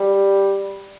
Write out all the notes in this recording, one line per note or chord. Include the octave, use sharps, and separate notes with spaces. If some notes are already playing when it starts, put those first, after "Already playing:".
Already playing: G3